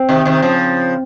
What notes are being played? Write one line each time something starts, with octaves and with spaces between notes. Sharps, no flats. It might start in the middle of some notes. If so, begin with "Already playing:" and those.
Already playing: C4
C3 D#3
C3 D#3
C#3 F3